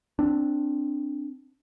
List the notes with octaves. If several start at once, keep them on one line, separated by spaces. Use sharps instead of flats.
C4 D4